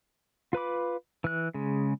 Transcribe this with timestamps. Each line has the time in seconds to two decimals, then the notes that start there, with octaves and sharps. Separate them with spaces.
0.53 F4 B4 B5 D6
1.24 E3 F#6
1.54 C#3 G#3